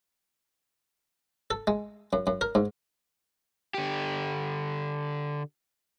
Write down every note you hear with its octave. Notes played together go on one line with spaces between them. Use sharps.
A4
G#3
F#2
F#2
A#4
G#2
D3 G4